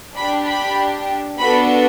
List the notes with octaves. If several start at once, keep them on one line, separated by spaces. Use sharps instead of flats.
D4 G4 B5
B5
B3 D4 F#4 A4 B5